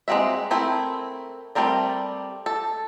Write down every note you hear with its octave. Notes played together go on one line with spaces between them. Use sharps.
G#3 A#3 C4 F#4 E5
A3 C4 E4 A#4
G3 A3 C4 A#4 D5
A4